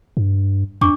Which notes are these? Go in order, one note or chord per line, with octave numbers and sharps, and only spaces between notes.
G2
F2 D4 C#6 D6